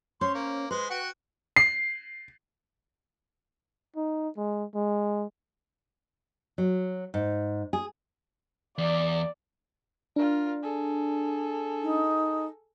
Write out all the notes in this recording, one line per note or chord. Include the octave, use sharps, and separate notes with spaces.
C#4 C5 C#5 C6
A#3
G#3 B4 C5
F#4 F#5 G5
C7
D#4
G#3
G#3
F#3
G#2
G#4
E2 D5
D4 F4 A#4
G#4 A4
D#4